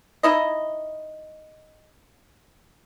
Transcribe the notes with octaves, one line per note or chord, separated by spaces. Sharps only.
D#4 E4 D#5